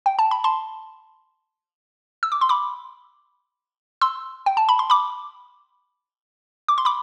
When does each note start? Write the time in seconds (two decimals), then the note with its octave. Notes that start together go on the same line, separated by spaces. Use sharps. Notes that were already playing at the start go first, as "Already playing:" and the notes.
0.06 G5
0.19 A5
0.31 B5
0.44 A5 C6
2.23 E6
2.32 D6
2.41 C6
2.49 B5 D6
4.01 C6 E6
4.46 G5
4.57 A5
4.69 B5
4.79 C6
4.90 B5 D6
6.68 D6
6.78 C6
6.85 B5 D6